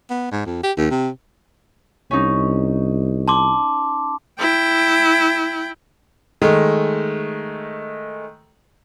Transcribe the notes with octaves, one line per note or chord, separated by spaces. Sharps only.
B3
G#2
F2
G4
D#2
C3
C2 C#4 D#4
A5 C6 D6
E4 G5
D#3 G#3 A3